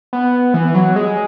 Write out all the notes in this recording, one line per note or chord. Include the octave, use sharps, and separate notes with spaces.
B3
E3
F#3
G#3